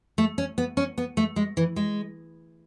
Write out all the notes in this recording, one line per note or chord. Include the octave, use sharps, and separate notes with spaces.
A3
C#4
B3
C#4
B3
A3
G#3
E3
G#3